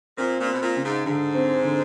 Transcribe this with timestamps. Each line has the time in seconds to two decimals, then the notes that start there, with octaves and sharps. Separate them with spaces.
0.18 A#2 C4
0.40 A#2
0.46 C4
0.53 B2
0.61 A#2
0.76 C#3
0.84 G#2
1.05 G#2 D3
1.35 C4
1.64 D3